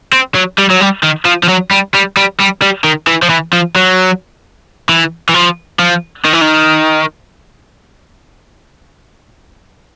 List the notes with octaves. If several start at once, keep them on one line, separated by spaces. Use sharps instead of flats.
C4
F#3
G3
F#3
G3
D#3
F3
F3
F#3
G3
G3
G3
G3
G3
D#3
E3
F3
E3
F3
F#3
E3
E3
F3
F3
D#3
E3
D#3